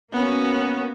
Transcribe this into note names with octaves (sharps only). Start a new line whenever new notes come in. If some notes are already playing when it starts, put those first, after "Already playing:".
A#3 B3 C#4 F#4